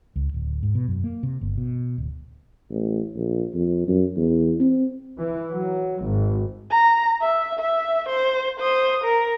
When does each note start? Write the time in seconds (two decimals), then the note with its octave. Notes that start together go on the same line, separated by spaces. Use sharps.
0.16 C#2
0.34 D1
0.63 G#2
0.75 B2
0.88 F#2
1.04 A#3
1.23 C3
1.41 G1
1.58 B2
1.98 D1
2.70 A1
3.16 A#1
3.54 F2
3.88 F#2
4.17 E2
4.60 C4
5.19 E3
5.53 F#3
6.05 G#1
6.70 A#5
7.22 E5
7.59 E5
8.09 C5
8.59 C5 D#6
9.04 A#4